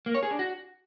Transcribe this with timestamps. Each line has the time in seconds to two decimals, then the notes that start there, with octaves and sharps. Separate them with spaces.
0.06 A#3
0.14 C#5
0.23 G#4
0.31 D4
0.39 F#4